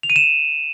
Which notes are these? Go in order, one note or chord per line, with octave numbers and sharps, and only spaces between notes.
F7
D#7
E7